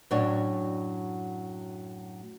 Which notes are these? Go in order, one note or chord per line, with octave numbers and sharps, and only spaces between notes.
F#2 A2 F#3 D4 C#5